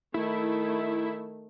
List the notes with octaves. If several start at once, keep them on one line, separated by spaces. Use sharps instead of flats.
D#3 A3 E4